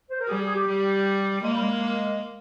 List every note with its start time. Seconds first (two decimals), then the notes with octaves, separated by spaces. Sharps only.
0.10 C5
0.20 A#4
0.28 G3 G#4
0.42 G#4
0.54 G4
0.67 G3
1.42 G#3 A#3
1.53 G3
1.62 G#3